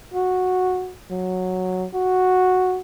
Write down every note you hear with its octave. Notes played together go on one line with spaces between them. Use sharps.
F#4
F#3
F#4